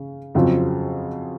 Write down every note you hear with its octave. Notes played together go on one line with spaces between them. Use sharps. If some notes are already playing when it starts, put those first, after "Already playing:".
Already playing: C#3 C#4
F2 C#3 F#3 C4 F4